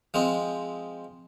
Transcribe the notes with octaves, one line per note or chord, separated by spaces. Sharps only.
F3 G#3 C4 D#5